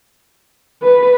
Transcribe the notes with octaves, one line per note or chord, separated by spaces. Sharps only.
B4